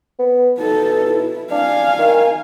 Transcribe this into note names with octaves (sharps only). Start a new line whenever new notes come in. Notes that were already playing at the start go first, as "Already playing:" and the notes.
B3
B2 D#4 A4
E4
D4 F5 G#5
D#3